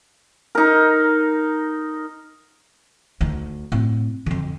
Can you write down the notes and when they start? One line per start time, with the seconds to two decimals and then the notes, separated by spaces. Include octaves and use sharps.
0.55 D#4 A#4
3.21 D2 D#4
3.72 A2 C4
4.26 F2 D3